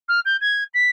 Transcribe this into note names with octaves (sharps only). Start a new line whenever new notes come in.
F6
G6
G#6
B6